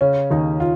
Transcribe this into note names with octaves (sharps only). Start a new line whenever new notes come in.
C#3 C#4
D#2 D#4
F4